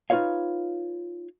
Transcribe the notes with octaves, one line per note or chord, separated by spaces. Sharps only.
D#4 F4 F#4 B4 C#5 F5